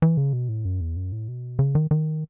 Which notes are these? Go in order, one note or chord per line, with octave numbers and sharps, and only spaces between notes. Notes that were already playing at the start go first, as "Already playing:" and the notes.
E3
C#3
B2
A2
F#2
E2
F#2
A2
B2
C#3
D#3
D#3